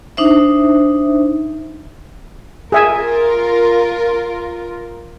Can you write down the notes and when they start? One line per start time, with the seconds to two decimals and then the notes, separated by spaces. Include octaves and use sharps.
0.17 D4 D#4 C5 E5
2.72 F4 G#4 A#4 E5 G#5